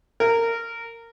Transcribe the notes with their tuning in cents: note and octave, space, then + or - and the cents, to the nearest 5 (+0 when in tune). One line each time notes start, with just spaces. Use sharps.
A#4 -20